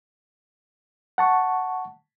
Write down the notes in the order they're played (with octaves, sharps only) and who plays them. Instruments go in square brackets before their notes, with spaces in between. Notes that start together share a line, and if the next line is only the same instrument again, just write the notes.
[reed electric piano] F#5 A5 C#6